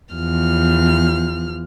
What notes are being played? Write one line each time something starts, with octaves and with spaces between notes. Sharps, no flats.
E2 F3 F6